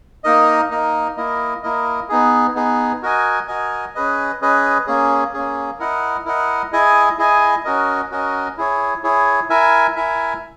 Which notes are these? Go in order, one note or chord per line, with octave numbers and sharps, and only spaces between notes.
A#3 D#4 A#4 D#5
A#3 D#4 A#4 D#5
A#3 E4 A#4 D#5
A#3 E4 A#4 D#5
B3 D#4 G#4
B3 D#4 G#4
F#4 A#4 D#5 G#5
F#4 A#4 D#5 G#5
C#4 G#4 B4 D#5
C#4 G#4 B4 D#5
A#3 C#4 G#4
A#3 C#4 G#4
E4 A#4 D#5 F#5
E4 A#4 D#5 F#5
E4 G#4 D#5 G#5
E4 G#4 D#5 G#5
C#4 F#4 A#4 D#5
C#4 F#4 A#4 D#5
E4 G#4 C#5
E4 G#4 C#5
E4 A#4 E5 G#5
E4 A#4 E5 G#5